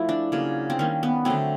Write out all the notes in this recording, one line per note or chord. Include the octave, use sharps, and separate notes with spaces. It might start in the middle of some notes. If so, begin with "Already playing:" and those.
Already playing: F3 A3 E4
D4
C#3 F#3 A#3
C4
D#3 G3 A#3 C#4
B3
D3 F#3 A3 C4